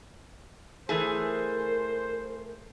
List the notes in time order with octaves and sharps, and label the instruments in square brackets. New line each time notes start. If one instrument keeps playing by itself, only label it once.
[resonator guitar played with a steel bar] E3 A3 G#4 [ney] A#4 [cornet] C5